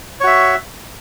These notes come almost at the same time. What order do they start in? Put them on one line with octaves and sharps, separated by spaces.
C#5 F#4 E5